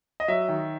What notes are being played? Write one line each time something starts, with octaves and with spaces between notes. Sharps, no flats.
D#5
F#3 E5
D#3